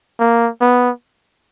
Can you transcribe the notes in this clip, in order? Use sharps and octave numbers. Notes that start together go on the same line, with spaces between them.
A#3
B3